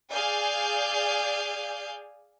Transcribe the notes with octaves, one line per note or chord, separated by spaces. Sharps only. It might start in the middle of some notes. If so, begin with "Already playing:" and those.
G#4 D5 F5 G#5 G6